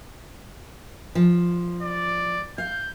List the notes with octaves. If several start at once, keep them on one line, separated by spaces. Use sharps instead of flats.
F3
D5
F5 G6